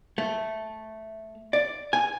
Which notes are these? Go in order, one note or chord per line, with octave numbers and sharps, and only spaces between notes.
A3
D5
G#5